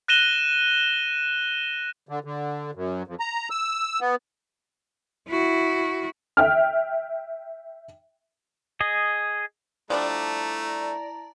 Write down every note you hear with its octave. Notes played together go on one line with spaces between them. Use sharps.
F#6 A#6 D#7 E7 G7
D3
D3
F#2
F2
A#5
E6
B3
E4 F#4
E5 G5 F6
G#4 D#5
F3 G3 A3 D4 E4 D5 A5 A#5